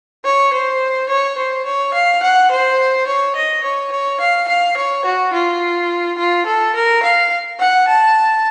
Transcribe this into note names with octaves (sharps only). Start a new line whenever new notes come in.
C#5
C5
C#5
C5
C#5
F5
F#5
C5
C#5
D#5
C#5
C#5
F5
F5
C#5
F#4
F4
F4
A4
A#4
F5
F#5
A5